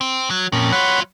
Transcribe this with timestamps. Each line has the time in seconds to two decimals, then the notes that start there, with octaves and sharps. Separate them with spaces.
0.01 C4
0.30 F#3
0.52 F2 A#2 C#4
0.72 F#3 F4 C#5 F#5 B5